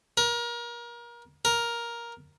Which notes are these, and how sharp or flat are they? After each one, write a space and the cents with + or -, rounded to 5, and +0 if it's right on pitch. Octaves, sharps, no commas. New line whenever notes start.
A#4 +30
A#4 +10